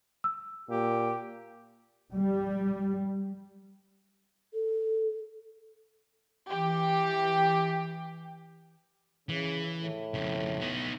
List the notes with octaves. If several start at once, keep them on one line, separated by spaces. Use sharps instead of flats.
E6
A#2 G4
G3
A4
E3 G4
C#3 E3
A2
F2 C#3
B3 D#4